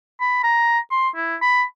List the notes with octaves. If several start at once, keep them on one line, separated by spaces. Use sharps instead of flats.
B5
A#5
C6
E4
B5